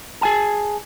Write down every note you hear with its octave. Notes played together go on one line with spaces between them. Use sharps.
G#4 G#5 A5